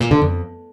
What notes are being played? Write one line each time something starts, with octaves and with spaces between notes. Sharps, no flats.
A#2
D3
F2